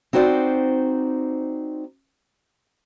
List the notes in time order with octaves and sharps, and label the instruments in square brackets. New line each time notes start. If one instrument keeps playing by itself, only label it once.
[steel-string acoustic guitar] C4 D#4 F#4 C5 D5